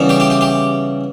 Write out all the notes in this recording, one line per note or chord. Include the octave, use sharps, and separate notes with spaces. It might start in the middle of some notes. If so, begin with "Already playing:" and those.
Already playing: C#3 E3 G3 B3
G4
G4
G4
G4